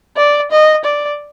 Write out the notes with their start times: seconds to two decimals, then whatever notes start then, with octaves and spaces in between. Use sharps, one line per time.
0.17 D5
0.51 D#5
0.84 D5